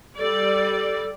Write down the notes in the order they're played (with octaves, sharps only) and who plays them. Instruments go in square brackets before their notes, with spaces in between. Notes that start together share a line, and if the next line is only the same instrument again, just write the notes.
[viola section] G3 D5 [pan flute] A4